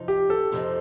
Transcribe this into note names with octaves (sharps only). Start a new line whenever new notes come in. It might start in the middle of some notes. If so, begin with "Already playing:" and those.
Already playing: F2 C3 F3 D#4
G4
A4
F2 C3 F3 C4 D#4